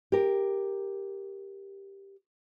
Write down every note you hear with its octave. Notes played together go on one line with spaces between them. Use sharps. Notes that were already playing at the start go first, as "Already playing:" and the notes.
G4 A#4